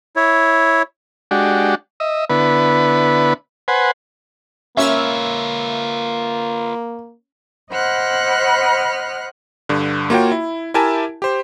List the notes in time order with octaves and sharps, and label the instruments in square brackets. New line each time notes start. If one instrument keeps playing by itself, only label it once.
[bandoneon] E4 C#5
[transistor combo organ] G#3 D4 F#4 G4
D#5 E5
D3 B3 E4 B4
B4 C5 F#5 G#5
[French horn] A#3 [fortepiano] C#4 [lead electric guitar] F4 B4 [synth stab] E5 E6 F6
[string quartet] C5 D#5 F#5 B5 F6 F#6
[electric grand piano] G2 D3
A#3 F4 F#4 C#5 G5
E4
E4 G4 A#4 E5 G#5 A5
G4 C5